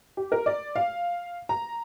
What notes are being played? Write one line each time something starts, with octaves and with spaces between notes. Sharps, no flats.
G4
A#4
D5
F5
A#5